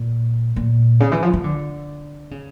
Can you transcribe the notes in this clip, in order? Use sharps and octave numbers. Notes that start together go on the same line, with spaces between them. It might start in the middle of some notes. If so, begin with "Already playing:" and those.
Already playing: A#2
A#2
C#3
E3
F3
F3
D3
C#3